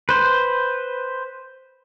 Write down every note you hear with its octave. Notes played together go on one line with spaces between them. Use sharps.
B4 C5